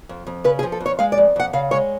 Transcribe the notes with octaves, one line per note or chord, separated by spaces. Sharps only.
F2
F2
C#3 B4
G#4
F3
A4
F2
C#5
G#3 F5
D5
F2
F2 F#5
C#3 F5
G#3 C#5